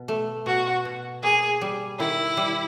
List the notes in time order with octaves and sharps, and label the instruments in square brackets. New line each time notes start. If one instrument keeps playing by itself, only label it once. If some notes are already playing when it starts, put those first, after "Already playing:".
Already playing: [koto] B2
A3
[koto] B2 [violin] F#4
[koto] B2
[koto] A#3 [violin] G#4
[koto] G3
[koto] D#3 [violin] E4
[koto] G3